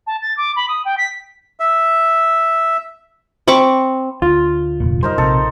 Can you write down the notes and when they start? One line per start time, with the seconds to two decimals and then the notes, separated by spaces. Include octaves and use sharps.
0.07 A5
0.22 A6
0.37 D6
0.56 B5
0.68 D#6
0.85 G5
0.98 B6
1.60 E5
3.48 C4 B5 C#6 D6
4.22 D2 F4
4.80 F1 A#2
5.03 G3 D#4 A#4 C5
5.18 A#1 C3 A4